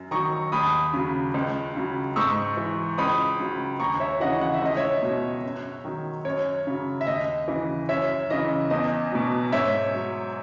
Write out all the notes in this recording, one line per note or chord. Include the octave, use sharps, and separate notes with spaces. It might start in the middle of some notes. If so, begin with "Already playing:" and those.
Already playing: F#2
D#3 F#3 A#5 C#6
D#2 B5 D#6
C#3 F#3
C#2
C#3 F#3
G#2 C#6 E6
E3
C#2 B5 D#6
C#3 F#3
D#2 A#5 C#6
C#5 E5
C#3 E3 D#5 F#5
F#5
E5
C#2 D#5
C#5 E5
B2 F#3
F#2
D#3 F#3
F#2 C#5
C#3 F#3
E5
D#2 D#5
C#3 E3
F#2 C#5 E5
C#3 E3 D#5
E2 D#5
B2 F#3
G#2 C#5 E5
F#3